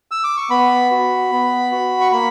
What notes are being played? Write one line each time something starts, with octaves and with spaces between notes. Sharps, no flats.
E6
D6
C#6
B3 B5
F#4
B3
F#4
C#6
A#3 B5